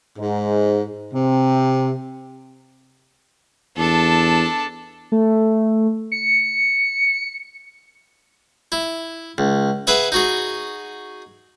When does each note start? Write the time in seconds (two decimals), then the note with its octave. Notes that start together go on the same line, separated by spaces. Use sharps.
0.18 G#2
1.14 C3
3.77 E2 D4 A4
5.12 A3
6.12 C#7
8.72 E4
9.38 C#2
9.87 G#4 B4 E5 F#5
10.12 D#4 F#4 G#4